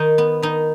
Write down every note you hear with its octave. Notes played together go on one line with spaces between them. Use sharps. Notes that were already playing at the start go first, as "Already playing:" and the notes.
Already playing: D#3 D#4
B3
D#3 D#4